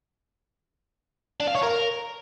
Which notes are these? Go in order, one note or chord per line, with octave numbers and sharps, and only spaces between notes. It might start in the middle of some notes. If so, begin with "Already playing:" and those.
D4
F5
C#5
A#4